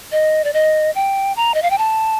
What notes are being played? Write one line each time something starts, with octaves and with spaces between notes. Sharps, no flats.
D#5
D5
D#5
G5
A#5
D#5
F5
G5
A5